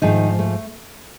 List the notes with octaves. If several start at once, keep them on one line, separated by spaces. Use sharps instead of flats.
G#2 D#3 F3 A3 D#4
A3